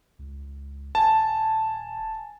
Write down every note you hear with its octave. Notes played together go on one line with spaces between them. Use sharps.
C#2
D#1 G#5 A5